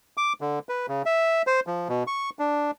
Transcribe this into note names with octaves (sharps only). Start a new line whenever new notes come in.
D6
D3
B4
C#3
E5
C5
F3
B2
C#6
D4